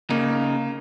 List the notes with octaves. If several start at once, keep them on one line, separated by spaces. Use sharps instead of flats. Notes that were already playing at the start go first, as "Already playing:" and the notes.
C#3 A#3 D#4